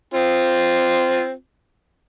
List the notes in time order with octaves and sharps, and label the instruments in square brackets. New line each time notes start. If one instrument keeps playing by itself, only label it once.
[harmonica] C4 F4